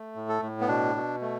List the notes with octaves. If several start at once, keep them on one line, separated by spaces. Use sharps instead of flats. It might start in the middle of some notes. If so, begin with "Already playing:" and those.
Already playing: A3
A2
A4
A2
B3
B2 D4
B2
A3